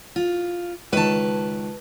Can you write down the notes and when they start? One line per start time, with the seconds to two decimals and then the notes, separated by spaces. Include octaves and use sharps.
0.16 F4
0.93 C#2 D#3 B4 A5